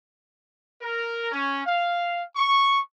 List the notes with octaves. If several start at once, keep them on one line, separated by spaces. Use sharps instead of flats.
A#4
C#4
F5
C#6